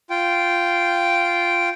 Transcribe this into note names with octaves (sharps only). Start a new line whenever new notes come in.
F4 G5